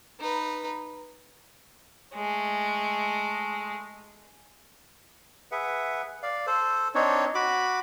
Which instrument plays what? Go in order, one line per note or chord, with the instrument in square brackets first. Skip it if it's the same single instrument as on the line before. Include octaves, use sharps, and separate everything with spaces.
[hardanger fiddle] D#4 B4
G#3 A3
[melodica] G#4 B4 E5 F#5
D5 F5
A4 C5
C4 D4 D#4 C#5
F#4 B5 D6